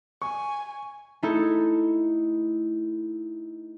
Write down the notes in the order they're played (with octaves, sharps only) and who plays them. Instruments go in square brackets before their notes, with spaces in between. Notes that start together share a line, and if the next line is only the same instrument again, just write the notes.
[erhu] G#5 [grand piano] C#6
[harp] A3 D#4 E4 A4